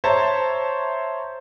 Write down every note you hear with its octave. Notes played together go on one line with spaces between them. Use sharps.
C5 C#5 E5 A5 A#5